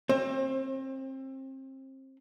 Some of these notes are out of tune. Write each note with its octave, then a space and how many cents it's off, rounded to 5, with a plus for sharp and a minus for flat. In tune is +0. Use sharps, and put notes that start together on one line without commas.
C4 +30 C5 +45